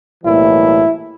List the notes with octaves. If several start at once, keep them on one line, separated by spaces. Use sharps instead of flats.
B1 A2 E3 G3 A#3 E4